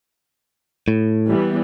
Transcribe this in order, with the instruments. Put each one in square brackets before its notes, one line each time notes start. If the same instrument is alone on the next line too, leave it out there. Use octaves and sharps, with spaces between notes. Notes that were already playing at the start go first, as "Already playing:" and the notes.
[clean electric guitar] A2
[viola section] E3 G3 B3